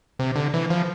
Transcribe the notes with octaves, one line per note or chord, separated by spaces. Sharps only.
C3
D3
E3
F3